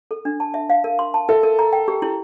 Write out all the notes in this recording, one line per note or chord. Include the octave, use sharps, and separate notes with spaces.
A4
D4
A5
E5
F5
A#4
C6
A5
A4 E5
A#4
A#5
G5
G4
E4